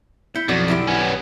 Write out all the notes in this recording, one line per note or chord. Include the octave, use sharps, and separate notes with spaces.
E4 G6 B6 C#7
B1 F2 F#4 D5
D3 E4 G4
B3 C#4